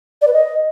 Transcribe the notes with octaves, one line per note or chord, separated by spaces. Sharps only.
D5
B4
D#5